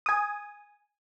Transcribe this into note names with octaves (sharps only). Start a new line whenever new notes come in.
G#5 D#6